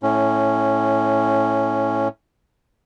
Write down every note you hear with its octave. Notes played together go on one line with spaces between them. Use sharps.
A2 C#4